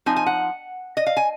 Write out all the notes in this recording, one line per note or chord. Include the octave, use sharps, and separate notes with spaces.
F3 C4 D#4 G#5
G#5
F#5
D#5
F5
G#5